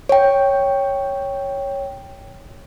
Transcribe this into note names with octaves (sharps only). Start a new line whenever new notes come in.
C#5 G5